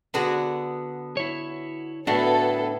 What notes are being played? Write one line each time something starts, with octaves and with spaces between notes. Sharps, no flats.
D3 B3 F#4 G#4
E4 C#5
A2 B3 D4 F#4 A4 B4